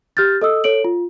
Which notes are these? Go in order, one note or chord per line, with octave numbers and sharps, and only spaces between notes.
G4 F6 G6 A6
A4 D#5 D#6 E6
A4 C#5 D7 F#7
F4